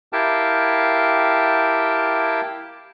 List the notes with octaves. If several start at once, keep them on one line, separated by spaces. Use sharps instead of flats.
E4 G4 A#4 F5 G5 A5